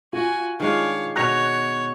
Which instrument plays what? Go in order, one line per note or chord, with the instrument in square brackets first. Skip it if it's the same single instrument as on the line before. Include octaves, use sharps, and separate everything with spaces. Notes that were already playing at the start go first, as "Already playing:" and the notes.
[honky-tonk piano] F4 [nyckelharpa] F#4 G#5
[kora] D#3 G#3 D4 [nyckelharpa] C#5 F5
[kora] B2 B3 [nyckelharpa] C#5 [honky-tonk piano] F#6 A#6 F7